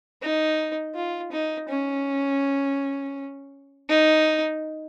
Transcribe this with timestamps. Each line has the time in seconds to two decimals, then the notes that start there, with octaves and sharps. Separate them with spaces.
0.22 D#4
0.95 F4
1.32 D#4
1.69 C#4
3.90 D#4